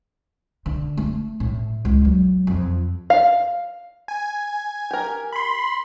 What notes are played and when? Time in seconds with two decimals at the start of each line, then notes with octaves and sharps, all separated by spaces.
0.66 D3
0.98 A3
1.40 A2
1.85 C#2
2.05 F#3
2.47 F2
3.10 F5
4.08 G#5
4.91 G4 A#4
5.33 B5 C6